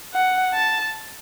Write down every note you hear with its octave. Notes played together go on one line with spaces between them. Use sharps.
F#5
A5